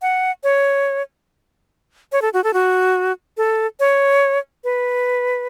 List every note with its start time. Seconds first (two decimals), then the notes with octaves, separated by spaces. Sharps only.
0.02 F#5
0.44 C#5
2.12 C#5
2.22 A4
2.33 F#4
2.44 A4
2.53 F#4
3.37 A4
3.80 C#5
4.64 B4